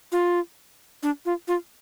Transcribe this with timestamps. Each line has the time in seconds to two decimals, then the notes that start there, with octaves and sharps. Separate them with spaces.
0.12 F4
1.03 D4
1.26 F4
1.48 F4